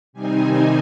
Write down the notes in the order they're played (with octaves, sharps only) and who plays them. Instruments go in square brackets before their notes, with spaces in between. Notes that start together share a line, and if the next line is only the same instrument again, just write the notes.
[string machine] C3 D#3 G3 C4 D#4 G#5